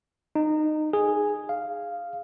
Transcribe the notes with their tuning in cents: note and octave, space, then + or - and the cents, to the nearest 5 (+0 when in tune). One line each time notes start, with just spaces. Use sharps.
D#4 -20
G#4 -5
F5 -5